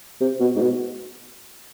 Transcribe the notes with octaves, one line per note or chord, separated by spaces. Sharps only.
C3
B2
G#2
B2